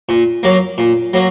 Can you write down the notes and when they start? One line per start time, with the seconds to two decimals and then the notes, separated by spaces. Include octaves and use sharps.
0.09 A#2
0.43 F#3 A#3
0.78 A#2
1.13 F#3 A#3